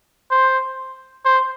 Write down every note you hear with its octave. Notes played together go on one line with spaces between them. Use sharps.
C5
C5